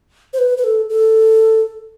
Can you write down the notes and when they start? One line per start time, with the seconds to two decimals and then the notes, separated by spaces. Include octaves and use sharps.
0.33 C5
0.39 B4
0.58 B4
0.64 A4
0.90 A4